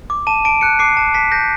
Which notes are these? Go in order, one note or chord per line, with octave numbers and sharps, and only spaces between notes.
D6
A5 D#7
A5 D7
F#6 C#7
D6 C7
A5
A5 B6
G6 A#6